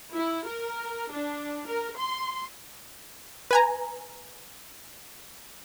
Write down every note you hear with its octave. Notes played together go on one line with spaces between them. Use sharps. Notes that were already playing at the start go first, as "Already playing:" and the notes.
E4
A#4
D4
A#4
C6
B4 G#5 A#5